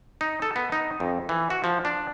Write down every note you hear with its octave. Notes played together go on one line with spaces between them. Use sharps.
D#4
A4
B3
D#4
F2
E3
F#4
F3
D4